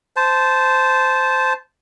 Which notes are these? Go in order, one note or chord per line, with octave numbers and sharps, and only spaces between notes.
C5 A5